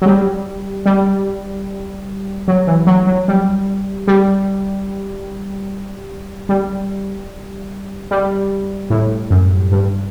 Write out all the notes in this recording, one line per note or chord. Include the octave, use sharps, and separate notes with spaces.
F#3
G3
G3
F#3
E3
F#3
F#3
G3
G3
G3
G3
A2
F#2
G2